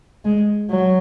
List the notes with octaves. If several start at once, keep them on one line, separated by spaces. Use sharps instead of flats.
G#3
F#3